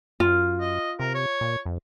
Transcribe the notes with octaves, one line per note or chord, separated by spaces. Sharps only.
F#2 F4
D#5
C3 A#4
C#5
A#2
F2